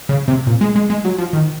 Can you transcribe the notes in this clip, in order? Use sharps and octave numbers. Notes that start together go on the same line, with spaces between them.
C#3
C3
A#2
G#3
G#3
G#3
F#3
F3
D#3